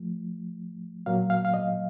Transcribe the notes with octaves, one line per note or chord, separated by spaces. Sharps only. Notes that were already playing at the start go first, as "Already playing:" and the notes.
Already playing: F3 A3
A#2 F#3 A#3 F5
F5
F5
D#5